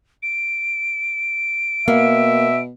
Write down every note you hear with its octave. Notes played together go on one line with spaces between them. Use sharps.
D7
B2 A#3 E5